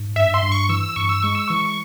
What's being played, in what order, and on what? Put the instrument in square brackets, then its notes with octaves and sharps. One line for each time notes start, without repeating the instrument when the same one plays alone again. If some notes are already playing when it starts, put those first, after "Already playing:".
Already playing: [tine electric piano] G#2
[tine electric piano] G2 [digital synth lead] E5
[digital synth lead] C6
[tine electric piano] G2
[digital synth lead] C#6
[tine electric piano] E3 [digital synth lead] E6
[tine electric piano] G2 [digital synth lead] C#6
[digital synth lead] E6
[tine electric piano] G#3 [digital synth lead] C#6
[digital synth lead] E6
[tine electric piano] E3 [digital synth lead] C#6